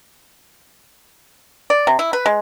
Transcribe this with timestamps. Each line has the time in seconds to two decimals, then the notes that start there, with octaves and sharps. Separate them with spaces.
1.70 D5
1.87 C3
1.99 E4
2.13 B4
2.26 G#3